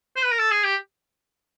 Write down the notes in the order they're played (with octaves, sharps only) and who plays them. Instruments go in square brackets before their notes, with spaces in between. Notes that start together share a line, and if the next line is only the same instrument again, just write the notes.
[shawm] C5
B4
A#4
A4
G#4
G4